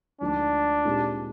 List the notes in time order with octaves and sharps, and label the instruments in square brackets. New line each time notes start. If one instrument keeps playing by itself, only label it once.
[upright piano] D2 D3 F3 G#3 D#4 [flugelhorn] D4
[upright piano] A#2 G#3 C4 D#4 G4